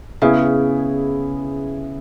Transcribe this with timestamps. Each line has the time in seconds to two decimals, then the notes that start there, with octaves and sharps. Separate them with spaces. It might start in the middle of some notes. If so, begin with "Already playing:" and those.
0.22 C#3 B3 E4 G#4